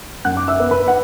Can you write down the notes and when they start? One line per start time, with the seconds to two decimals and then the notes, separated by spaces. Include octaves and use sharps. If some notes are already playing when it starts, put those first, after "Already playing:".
0.25 F#2 F#5 F#6
0.37 D6
0.48 E5 E6
0.59 B3
0.71 B4 B5
0.88 F#5